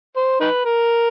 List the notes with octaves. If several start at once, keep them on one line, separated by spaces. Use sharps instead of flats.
C5
D#4 B4
A#4